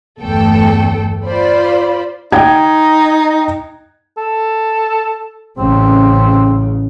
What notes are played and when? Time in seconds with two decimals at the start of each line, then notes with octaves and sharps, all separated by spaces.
0.21 G1 E2 A3 A4 G5
1.25 F4 C5 D5 B5
2.32 D#4 G5 G#6
4.18 A4
5.58 A1 C#3 C4